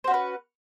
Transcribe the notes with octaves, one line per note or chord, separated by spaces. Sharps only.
C#4 F#4 B4 C5